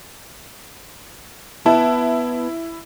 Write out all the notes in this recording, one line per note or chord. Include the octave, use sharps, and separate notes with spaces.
B3 E4 A5